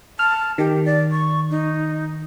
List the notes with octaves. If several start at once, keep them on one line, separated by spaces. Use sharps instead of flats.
A5 F6
D#3 G4
D5
C#6
D#4